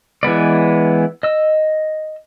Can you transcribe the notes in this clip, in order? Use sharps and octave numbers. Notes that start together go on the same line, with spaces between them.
E3 G#3 B3 D5
D#5 E6